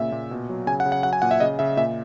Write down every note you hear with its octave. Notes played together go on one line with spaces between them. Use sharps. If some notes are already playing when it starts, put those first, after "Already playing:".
Already playing: A#2 C#3 E5
A#2
B2
F#3
C#3 G#5
F#5
C#3
F#5
F#3 F#5
G#5
A#2 F#5
E5
C#3 D#5
C#3 E5
A#2 E5